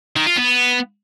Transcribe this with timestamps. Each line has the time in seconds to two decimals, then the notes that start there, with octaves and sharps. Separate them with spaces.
0.16 D#3
0.26 F4
0.36 B3